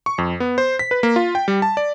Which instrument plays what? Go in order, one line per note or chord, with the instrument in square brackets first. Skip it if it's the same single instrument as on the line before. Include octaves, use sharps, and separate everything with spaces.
[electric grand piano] C#6
F2
B3
C5
B6
B4
A#3
F4
G5
G3
A5
D5